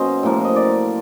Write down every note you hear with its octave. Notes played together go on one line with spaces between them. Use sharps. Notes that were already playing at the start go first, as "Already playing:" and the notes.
Already playing: B2 F#3 A#3 C#4 C5 D#5
A2 F3 A#3
D#5
D5